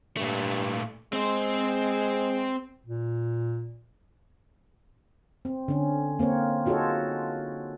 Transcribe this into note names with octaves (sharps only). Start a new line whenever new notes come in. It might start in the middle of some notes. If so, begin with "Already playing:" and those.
G2 A#2 A3
G#3 C4 C5
A#2
C4
D3 C#4
A#3 C4 A#4 C#5
D#4 F4 F#4 G#4 A4 C#5